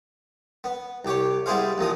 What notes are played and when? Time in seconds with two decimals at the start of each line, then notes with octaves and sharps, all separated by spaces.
0.64 B3
1.05 C2 G4 C#5
1.46 G3 B3 E4 G#4 C5 F5
1.78 A1 A#2 F3 D#6